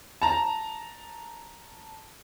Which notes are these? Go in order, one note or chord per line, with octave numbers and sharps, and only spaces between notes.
A5 A#5